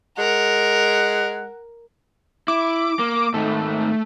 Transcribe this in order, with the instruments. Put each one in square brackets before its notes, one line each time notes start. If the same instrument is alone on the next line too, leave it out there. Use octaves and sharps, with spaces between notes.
[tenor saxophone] G#3 [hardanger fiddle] A#4 [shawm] F#5
[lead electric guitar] E4 [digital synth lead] D6
[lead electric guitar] A#3
[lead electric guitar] G#2 D#3 [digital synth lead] A3